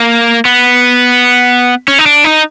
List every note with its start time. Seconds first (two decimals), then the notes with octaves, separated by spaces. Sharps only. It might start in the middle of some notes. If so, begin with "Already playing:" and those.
Already playing: A#3
0.45 B3
1.88 C#4
1.99 D#4
2.06 D4
2.24 D#4